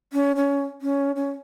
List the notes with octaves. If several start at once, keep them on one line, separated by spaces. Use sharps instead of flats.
C#4
C#4
C#4
C#4